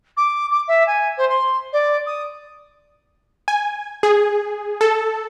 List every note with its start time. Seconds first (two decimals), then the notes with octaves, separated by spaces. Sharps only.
0.17 D6
0.51 D6
0.68 E5
0.87 G#5
1.17 C5
1.29 C6
1.73 D5
2.06 D#6
3.48 G#5
4.03 G#4
4.81 A4